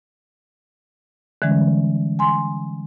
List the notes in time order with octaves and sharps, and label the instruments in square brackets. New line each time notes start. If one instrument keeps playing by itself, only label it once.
[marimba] D3 E3 G3 G#3 C#4
G#5 C6